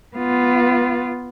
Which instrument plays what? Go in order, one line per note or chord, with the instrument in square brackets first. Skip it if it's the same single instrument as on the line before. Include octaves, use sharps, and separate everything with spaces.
[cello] B3 F4